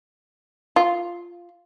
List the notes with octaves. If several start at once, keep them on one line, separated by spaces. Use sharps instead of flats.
F4